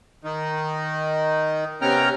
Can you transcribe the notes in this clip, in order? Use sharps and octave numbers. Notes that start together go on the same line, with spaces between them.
D#3 D#4
C3 B3 C#4 G5 A#5 F6